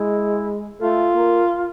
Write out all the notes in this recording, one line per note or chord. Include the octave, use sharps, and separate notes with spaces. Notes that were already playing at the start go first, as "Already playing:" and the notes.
Already playing: G#3 E4
A3 F4
A#3